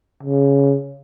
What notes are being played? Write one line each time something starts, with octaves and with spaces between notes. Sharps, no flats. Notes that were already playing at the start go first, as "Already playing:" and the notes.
C#3